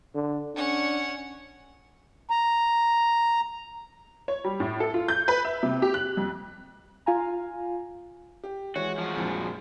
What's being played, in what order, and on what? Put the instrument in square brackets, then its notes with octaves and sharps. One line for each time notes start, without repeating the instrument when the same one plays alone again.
[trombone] D3
[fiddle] C#4 F#5 [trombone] D4
[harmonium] A#5
[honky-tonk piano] C#5
G3
A2
A4
F4
G6
B4
E5
C3
G4
F#6
F2
[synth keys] F4 F5 G#5 A#5
[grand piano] G4
[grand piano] E3 G#3 C#5 [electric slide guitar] F#4
[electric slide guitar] F3 F#4
[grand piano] A#1 F2 G#3